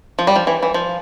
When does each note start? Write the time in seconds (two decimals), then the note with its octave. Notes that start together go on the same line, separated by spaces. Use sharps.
0.19 F3
0.27 G3
0.36 F3
0.47 E3
0.63 E3
0.74 F3